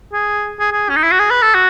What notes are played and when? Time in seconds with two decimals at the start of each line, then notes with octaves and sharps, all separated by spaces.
0.13 G#4
0.60 G#4
0.72 G#4
0.89 C#4
0.96 D#4
1.04 E4
1.12 F#4
1.19 G#4
1.31 B4
1.42 A4
1.55 F#4